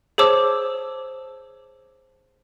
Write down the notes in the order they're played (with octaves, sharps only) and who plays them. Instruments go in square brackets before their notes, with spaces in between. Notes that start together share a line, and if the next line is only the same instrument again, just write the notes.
[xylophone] G#4 C5 C#5 A5 D6 E6